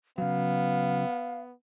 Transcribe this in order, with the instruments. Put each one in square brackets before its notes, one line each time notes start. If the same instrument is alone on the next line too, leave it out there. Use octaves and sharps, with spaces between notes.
[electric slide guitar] C#3 F#3 [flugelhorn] B3 [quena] F5